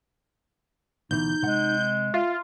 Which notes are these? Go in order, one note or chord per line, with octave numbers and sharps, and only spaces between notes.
D2 B2 E3 D#4 G6
C3 G#3 F#5
F4 E5 F5